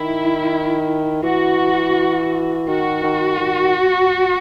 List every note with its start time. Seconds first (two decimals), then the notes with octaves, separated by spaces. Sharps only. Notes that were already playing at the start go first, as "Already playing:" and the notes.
Already playing: D#3 E4
1.23 E3 F#4
2.68 D#3 F#4
3.03 D#3
3.40 D#3